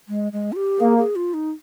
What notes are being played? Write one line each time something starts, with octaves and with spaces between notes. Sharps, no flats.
G#3
G#3
F4
G4
A#3 G#4
G#4
F4
D#4